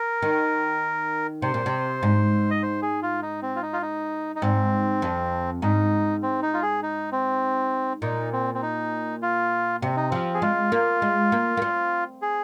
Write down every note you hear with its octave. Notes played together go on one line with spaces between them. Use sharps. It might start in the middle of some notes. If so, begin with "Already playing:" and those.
Already playing: A#4
D#3
C3 C5
A#2
C3
G#2
D#5
C5
G#4
F4
D#4
C4
F4
D#4
F4
D#4
D#4
G#2 C4
F2
G#2 D#4
C4
D#4
F4
G#4
D#4
C4
A#2 D#4
C4
C4
D#4
F4
C3 C4
D#4
F3 C4
G#4
G#3 F4
A#3
G#3
A#3
A#3
C4
G#4